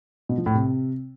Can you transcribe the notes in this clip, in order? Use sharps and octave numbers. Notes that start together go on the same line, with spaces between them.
B2
F3
A2
C3